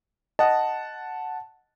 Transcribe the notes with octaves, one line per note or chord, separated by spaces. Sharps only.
D#5 F#5 A5